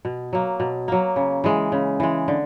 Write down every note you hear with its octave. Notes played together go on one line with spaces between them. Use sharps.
B2
F#3 A#3
B2
F#3 A#3
C#3
E3 G#3
C#3
E3 G#3
D3